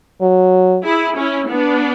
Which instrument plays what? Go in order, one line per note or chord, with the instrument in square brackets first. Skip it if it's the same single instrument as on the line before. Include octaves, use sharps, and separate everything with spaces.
[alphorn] F#3
[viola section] E4 G#4
C#4 E4
B3 D4